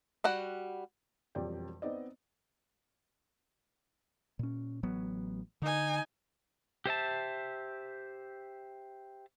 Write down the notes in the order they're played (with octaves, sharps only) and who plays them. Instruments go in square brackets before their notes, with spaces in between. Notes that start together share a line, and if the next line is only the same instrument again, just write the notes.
[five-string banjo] G3 F#4 F#5
[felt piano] E1 F2 G3 D5 G5
B3 C4 D#4 D5 D#5
[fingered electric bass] A#2 C#4
A1 F#3 B3
[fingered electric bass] D3 [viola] D#4 G#5
[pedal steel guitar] G4 C5 E5 A5